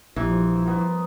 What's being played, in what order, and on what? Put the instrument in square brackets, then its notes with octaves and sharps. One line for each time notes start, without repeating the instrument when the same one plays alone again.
[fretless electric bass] A#1 [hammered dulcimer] G2 D#4 C6 [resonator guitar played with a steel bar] E3 [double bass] F3
[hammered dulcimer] B3 A#4 C5